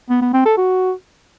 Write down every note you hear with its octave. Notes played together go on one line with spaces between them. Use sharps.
B3
B3
C4
A4
F#4